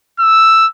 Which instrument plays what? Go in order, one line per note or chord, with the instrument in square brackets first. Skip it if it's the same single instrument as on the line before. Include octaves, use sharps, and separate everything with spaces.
[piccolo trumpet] E6